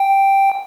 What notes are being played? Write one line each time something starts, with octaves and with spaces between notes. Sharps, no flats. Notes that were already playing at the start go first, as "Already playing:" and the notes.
Already playing: G5